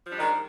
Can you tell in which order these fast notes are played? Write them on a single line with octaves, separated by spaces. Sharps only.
F3 D4 G3 G#3 D#3